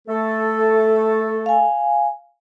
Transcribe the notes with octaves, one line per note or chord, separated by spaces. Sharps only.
A3 A4
F5 G#5